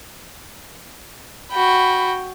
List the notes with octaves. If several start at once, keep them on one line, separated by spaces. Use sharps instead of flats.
F#4 G5 B5